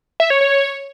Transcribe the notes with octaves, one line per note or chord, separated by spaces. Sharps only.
E5
C#5
C#5